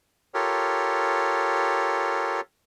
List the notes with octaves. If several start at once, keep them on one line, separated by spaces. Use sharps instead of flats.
F4 G4 A4 A#4 C#5